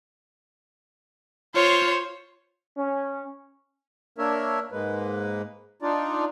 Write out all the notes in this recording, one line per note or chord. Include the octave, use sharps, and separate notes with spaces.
F4 C5 C#5
C#4
A#3 D4 A#4 C#5 E5
G#2 G#3 A#3 B4
D4 D#4 F4 D5